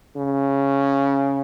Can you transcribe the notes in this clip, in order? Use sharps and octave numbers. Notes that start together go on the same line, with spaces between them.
C#3